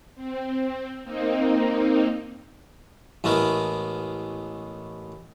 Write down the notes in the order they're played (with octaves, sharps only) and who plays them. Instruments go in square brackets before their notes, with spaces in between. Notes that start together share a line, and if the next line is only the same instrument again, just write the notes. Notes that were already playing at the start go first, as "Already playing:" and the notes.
[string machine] C4
A#3 C4 D#4
[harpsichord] A1 G#3 A3 B3 A#4